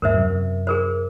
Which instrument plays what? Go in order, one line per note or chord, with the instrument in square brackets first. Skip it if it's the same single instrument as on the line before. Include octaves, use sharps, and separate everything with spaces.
[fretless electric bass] D#2 G#2 [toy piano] A#4 C5 E5
[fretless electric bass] F#2 C3
[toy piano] G#4 A#4 C5